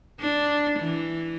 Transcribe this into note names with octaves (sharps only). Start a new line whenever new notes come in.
D4
E3